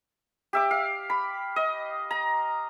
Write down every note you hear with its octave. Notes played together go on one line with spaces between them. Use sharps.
G4 E5 D6
F5
B5
D#5
A#5